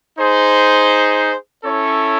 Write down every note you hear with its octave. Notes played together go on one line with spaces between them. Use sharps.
D#4 G#4 C5
C#4 E4 A4 C#5